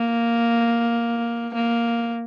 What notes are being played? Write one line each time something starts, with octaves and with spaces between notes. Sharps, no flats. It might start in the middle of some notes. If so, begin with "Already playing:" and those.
Already playing: A#3
A#3